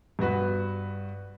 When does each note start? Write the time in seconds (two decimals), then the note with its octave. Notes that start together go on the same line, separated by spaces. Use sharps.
0.19 G2 B3 F#4 B4